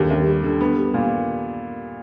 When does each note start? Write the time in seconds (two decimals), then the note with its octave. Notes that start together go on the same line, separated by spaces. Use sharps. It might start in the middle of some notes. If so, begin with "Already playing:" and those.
Already playing: D#2 D3 G3
0.10 D#2
0.27 G3
0.44 D3
0.61 B3
0.78 G3
0.94 A#2